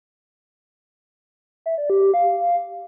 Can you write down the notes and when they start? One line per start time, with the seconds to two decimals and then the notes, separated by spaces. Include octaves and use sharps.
1.66 E5
1.78 D5
1.90 G4
2.02 G4
2.14 F5